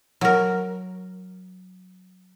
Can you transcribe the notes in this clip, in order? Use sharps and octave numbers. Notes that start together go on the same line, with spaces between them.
F#3 A#4